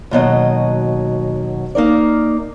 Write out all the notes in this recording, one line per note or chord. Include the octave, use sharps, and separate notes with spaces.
D#2 B2 F#3 D#5
A#3 D#4 A#4 D5